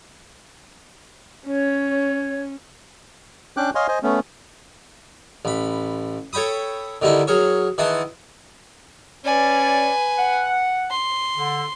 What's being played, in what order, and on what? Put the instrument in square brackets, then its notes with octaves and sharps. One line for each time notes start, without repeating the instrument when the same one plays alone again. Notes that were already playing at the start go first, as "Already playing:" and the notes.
[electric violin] C#4 [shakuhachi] C#5
[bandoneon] C#4 D4 G5 D6 F#6
C#5 D#5 F5 G#5 C6
C5 D#5 G#5
A3 B3 C#4
[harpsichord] A1 B5
A4 C#5 G5 B5 D#6
D3 D#3 G3 D#4 E4
F#3 G#4 A#4 C#5
D#3 E3 G#4 F#5 A5 C6
[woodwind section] C#4 C#5 D5 [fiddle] B4 G#5
[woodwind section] F#5
[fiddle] C6
[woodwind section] D3